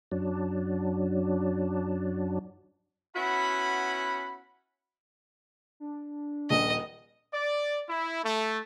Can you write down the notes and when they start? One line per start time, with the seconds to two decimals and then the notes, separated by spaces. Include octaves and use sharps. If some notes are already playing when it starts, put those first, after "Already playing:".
0.12 F#2 F#3 D4
3.16 B3 C#4 E4 F#4 F#5 B5
5.80 D4
6.50 D#1 A#1 D#5
7.32 D5
7.88 E4
8.23 A3